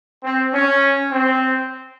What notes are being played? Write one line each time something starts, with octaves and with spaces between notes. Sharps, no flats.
C4
C#4
C4